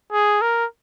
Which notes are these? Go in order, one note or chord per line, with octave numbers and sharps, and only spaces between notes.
G#4
A#4